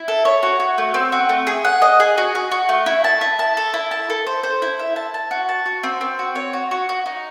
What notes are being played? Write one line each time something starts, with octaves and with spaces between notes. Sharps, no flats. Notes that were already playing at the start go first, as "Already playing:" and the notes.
Already playing: E4
A4
C#5
F#4
F#4
A3
C4
F#4
A3
G#4
F#5
D#5
G#4
F#4
F#4
F#4
A3
E4
A5
E4
A5
A4
E4
A5
A4
C5
C5
E4
E5
A5
A5
F#4
A5
F#4
C4
C4
F#4
C#5
F#4
F#4
F#4
D#4